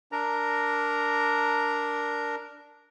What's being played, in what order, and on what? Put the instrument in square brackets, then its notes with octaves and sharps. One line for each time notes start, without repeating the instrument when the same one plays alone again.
[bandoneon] D4 A#4 A#5